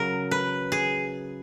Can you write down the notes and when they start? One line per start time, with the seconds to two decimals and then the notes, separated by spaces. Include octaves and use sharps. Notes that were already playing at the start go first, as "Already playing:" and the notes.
Already playing: C#3 F#3 A#4
0.31 B4
0.72 G#4